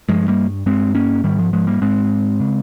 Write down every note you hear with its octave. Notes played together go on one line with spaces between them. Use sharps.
G2 F3 G#3
G3 A#3
G2 G#3 C4
A#3 C#4
G#2 D#3 G3
F3
F3 G#3
G3 A#3
G#2 G#3 C4
C#3